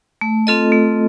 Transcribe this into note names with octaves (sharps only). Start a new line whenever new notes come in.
A3
C4 F4 A4 D#5
A3